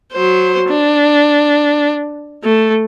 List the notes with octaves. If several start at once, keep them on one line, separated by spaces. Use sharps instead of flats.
F#3 C5
D4
A3